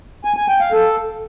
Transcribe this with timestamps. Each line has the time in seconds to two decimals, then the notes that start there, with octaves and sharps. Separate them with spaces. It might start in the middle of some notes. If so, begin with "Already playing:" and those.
0.25 G#5
0.36 G#5
0.48 G5
0.60 F5
0.72 A4